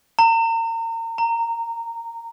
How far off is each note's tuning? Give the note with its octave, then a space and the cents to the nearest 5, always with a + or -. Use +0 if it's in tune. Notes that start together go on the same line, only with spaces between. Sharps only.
A#5 -35
A#5 -15